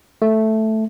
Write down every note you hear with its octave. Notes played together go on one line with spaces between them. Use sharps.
A3